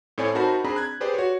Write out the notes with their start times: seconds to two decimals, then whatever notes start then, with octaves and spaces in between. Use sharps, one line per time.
0.18 A2 A3 C4 C#5 D5 G#5
0.35 D#4 F#4 A#4 C5 A5 B5
0.64 C4 D4 G#4 A#5 B5
0.76 F#6 G#6
1.01 G4 G#4 B4 C5 D5
1.14 F#4 C#5